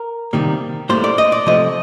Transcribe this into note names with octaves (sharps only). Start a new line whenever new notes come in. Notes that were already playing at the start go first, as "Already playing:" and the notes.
Already playing: A#4
C3 D#3 G3 A#3
A2 G3 A#3 C5
D5
D#5
D5
C3 F3 A3 D#5